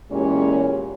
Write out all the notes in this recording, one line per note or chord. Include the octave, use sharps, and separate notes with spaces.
E2 A#2 G#3 C#4 G4 C#5